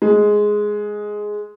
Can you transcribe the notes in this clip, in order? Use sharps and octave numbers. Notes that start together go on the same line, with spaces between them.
G#3